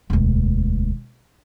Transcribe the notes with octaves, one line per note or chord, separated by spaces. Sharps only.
E1 D2